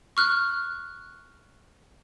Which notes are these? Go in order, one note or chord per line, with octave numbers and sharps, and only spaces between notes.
C#6 F6 F#6